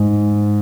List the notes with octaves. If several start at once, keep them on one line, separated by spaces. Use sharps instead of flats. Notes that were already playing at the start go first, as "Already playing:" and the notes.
Already playing: G#2